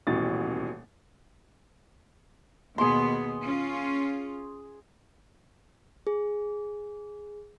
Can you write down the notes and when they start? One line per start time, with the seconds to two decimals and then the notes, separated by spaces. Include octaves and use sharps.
0.07 D#1 A1 B2 E3 A6
2.78 D#2 B2 B3 G#4 C6
3.44 C#4 F4
6.07 G#4